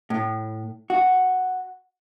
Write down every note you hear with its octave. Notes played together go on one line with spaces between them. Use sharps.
A2
F#4